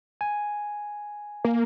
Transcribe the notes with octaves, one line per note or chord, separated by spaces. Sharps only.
G#5
A#3